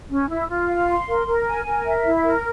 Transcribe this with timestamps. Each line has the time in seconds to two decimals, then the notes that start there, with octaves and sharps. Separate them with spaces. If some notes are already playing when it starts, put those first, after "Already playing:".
0.10 C#4
0.29 E4
0.49 F4
0.68 F5
0.88 C6
1.07 A#4
1.27 A#4
1.46 G#5
1.65 A#4
1.85 E5
2.05 E4
2.24 A#4